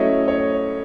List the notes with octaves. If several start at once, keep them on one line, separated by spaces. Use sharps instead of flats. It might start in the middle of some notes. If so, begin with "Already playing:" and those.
Already playing: F#3 A3 C#4 E4 C#5 D#5
C#5